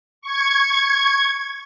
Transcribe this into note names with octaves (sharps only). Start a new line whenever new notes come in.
C#6 G#6